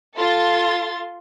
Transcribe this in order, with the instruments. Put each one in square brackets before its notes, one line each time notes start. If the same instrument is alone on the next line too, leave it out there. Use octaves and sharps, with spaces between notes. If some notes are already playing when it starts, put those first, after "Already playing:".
[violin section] F4 A4 C6 A6